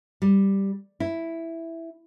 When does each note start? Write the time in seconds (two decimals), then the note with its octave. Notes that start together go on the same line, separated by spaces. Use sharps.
0.22 G3
1.00 E4